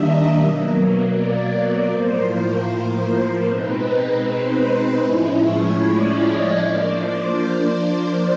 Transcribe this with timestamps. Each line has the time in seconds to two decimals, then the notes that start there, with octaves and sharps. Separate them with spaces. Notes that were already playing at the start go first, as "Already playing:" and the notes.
Already playing: D#3 G3 A#3 D4 D#5 E5
0.32 B2 F#3 A#3
1.10 D5
1.88 A2 F3 A#3 C5
2.26 C5
3.04 C5
3.43 B2 G#3 C4 D#4 B4
4.22 C5
4.99 A2 F3 G#3 C#4 E4
5.38 C#5
5.77 D5
6.17 D#5
6.56 F3 A#3 D4 D5
6.94 C5
7.34 C5